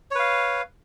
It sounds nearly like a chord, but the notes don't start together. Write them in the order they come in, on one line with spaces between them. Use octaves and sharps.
C#5 B4 F5